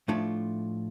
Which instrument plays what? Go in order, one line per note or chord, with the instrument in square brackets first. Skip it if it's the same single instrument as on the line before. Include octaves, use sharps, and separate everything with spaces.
[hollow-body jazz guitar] A2 F3 A3 D4 F4